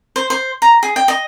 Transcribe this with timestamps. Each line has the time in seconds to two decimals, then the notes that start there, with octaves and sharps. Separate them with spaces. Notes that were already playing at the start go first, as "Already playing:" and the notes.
0.16 C5
0.30 C5
0.62 A#5
0.83 G#4
0.96 G5
1.08 D#5